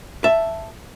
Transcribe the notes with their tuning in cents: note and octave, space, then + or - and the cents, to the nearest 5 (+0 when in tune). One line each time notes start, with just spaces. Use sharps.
E5 +5 A5 +0